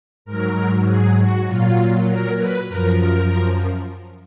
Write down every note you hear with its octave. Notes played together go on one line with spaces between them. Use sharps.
G#2 F#3 A#4
G#4
F#4
A#2 F#3 F4
A#4
B4
F#2 F3 A#4
A#4